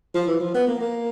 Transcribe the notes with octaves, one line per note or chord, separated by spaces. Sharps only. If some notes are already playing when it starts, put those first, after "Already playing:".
F3
E3
F3
B3
A#3
A#3